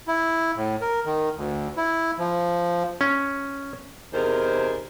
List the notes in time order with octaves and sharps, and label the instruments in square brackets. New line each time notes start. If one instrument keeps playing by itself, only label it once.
[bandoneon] E4
A2
A#4
D#3
D2
E4
F3
[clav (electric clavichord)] C#4
[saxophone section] E2 C3 D#3 G#4 A#4 C5